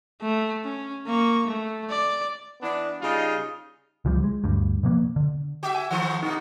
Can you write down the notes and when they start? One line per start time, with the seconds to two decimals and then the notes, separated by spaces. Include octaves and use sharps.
0.22 A3
0.64 C#4
1.06 A#3 C#6
1.47 A3
1.90 D5
2.62 E3 B3 D4
3.01 C#3 G3 D#4 F4
4.05 C#2 E3 F3 G3
4.24 G#3
4.44 D2 G2
4.83 B2 F3 A#3 B3
5.16 D3
5.63 F#4 E5
5.75 G#5
5.91 D#3 F3 A3 F#5 C6
6.23 B2 B3 D#4